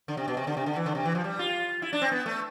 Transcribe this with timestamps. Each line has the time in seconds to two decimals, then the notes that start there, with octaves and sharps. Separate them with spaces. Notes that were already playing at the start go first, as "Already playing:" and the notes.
0.08 D3
0.17 C3
0.28 B2
0.37 C3
0.47 D3
0.57 C3
0.66 D3
0.76 E3
0.86 D3
0.95 C3
1.05 E3
1.15 F3
1.24 G3
1.39 F4
1.82 E4
1.93 D4
2.02 C4
2.12 B3
2.26 A3